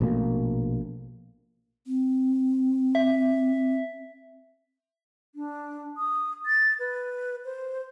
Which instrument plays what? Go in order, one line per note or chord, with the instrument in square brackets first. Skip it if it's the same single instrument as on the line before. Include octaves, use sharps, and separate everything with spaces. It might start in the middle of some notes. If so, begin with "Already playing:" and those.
[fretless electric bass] A#1 B2 A3 A#3
[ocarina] C4
[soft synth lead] E5
[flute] D4
D#6
A6
B4
C5